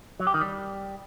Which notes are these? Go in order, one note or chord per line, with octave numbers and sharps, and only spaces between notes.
F#3
G4
D#3
G3